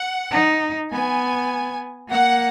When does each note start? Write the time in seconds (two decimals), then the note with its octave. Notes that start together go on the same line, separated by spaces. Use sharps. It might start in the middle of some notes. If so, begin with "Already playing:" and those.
Already playing: F#5
0.31 D#4
0.91 B3 G#5
2.09 A#3 F#5